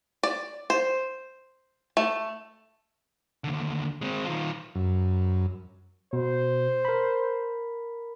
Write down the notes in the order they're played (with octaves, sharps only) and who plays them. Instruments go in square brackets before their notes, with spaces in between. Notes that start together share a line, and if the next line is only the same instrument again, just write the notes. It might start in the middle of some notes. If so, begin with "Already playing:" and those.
[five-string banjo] D5
C5
A3
[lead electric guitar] D#2 D3
G#3 C4
D#3 F4
[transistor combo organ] F#2
[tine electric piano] B2 [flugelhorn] C5
[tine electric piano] A#4 B5